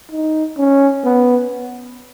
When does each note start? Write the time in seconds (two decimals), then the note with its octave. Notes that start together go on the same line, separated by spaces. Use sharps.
0.11 D#4
0.58 C#4
1.04 B3